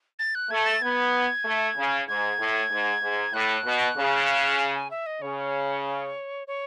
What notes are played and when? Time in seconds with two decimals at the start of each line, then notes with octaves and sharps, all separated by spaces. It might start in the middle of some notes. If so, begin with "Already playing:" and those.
0.19 A6
0.35 F#6
0.51 A3 G#6
0.66 A6
0.82 B3 G#6
1.45 A3
1.77 C#3
2.08 G#2 G#6
2.39 A2
2.71 G#2
3.02 G#2
3.33 A2 F#6
3.65 B2
3.97 C#3
4.59 G#5
4.75 G#5
4.91 E5
5.06 D#5
5.22 C#3 C#5
6.47 C#5